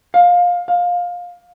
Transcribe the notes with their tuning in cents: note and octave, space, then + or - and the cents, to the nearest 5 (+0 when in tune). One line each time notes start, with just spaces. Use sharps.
F5 +20
F5 +20